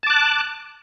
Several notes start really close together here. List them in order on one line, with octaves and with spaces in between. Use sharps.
A5 D6 F#6